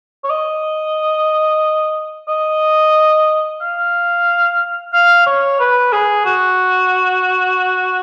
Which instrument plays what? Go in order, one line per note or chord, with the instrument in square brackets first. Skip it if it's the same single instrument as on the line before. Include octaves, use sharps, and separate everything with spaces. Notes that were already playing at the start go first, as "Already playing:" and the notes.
[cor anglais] C#5
D#5
D#5
F5
F5
C#5
B4
G#4
F#4